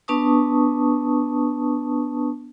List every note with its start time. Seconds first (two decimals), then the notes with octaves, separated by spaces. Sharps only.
0.08 B3 D4 B4 A5 C#6 D#6